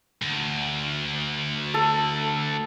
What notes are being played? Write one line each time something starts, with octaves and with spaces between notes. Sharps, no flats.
D2
A4